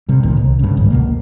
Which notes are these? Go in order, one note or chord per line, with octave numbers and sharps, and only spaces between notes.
C3 G3
C2 A#2 D#3
C2
G2 C#3
G#1 C#2
C#2 B2 A#3